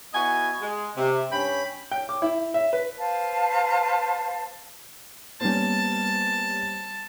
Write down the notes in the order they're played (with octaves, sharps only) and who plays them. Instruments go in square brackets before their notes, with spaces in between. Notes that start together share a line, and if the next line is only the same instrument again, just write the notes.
[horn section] B3 E4 F#4 D#5 G#5
G#3
C3
G2 C#4 G5 B5
[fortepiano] G5
D6
E4
E5
B4
[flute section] B4 C5 F5 A5
[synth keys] G3 C5 [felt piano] A#3 B3 C#4 [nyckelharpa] A5